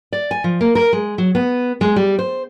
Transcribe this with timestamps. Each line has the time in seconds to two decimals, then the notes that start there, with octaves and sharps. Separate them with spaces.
0.13 D5
0.31 G#5
0.44 F3
0.61 A#3
0.75 A#4
0.93 G#3
1.18 F#3
1.35 B3
1.81 G#3
1.96 G3
2.19 C5